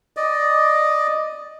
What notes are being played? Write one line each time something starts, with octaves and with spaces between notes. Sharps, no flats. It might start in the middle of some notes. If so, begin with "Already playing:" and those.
D5 D#5